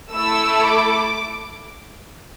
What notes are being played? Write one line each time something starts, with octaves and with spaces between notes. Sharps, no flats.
A3 E4 A4 E6
D6